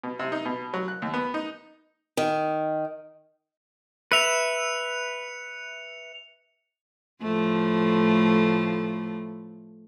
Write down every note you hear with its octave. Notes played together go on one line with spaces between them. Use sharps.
B2
C3
D#4
B2
F#3
F#6
D#2
B3
D#4
D#3
B4 E5 C#7 F7
A2 F3 A3